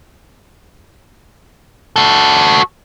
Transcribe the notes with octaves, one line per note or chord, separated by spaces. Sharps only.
F#4 A4